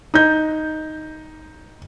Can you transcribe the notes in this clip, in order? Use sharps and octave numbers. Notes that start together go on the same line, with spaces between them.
D#4 G6